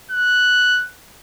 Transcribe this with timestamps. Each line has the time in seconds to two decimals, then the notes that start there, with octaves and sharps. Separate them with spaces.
0.11 F#6